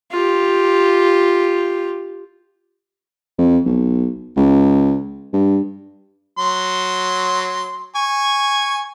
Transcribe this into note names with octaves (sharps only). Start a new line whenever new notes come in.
F4 G4
F2
B1
C#2
G2
F#3 C6
G#5 C#6